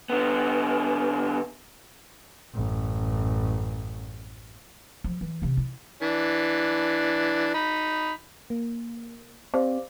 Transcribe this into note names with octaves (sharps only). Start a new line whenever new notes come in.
D3 B3
A1 F#2
F3
E3
C3 C4
E4
E3 D4
D#4 B5
A#3
C4 G4 C5 D5 F5